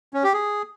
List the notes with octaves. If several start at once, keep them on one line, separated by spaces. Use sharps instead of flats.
C#4
G4
G#4